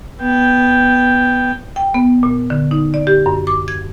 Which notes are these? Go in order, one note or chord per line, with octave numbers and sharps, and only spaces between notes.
B3 G5
G5
B3
A#2
D3
D#4
D5
G4
F#2
D6
G#6